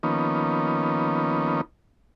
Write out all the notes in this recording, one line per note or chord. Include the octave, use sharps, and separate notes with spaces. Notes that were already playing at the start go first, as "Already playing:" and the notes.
D#3 F3 A#3 B3 C#4 D#4